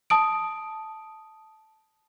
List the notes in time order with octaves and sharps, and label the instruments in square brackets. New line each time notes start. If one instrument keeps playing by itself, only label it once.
[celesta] A5 D#6 D7